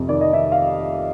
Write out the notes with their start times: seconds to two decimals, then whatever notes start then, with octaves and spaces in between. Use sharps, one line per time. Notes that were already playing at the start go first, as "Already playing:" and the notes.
Already playing: F2 C3
0.08 D#3 D5
0.21 D#5
0.33 D#3 E5
0.52 F5